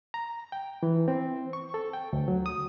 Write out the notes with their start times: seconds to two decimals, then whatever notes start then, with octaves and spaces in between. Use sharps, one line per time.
0.14 A#5
0.52 G5
0.83 E3
1.08 C4
1.53 C#6
1.74 A4
1.93 G5
2.13 D2
2.28 F#3
2.46 D#6